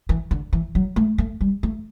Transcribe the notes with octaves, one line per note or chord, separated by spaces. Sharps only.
E3
D3
E3
F#3
A3
A3
G3
A3